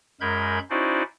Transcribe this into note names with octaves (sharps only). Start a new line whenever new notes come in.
F#2 G#3 A#4 B5 G6 G#6
C#4 D#4 E4 F#4 C5 D5